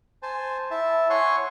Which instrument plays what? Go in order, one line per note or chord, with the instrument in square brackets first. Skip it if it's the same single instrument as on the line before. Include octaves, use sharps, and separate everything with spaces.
[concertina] C5 G#5 A5
E4 E5 A5
C#5 F#5 G#5 C6 C#6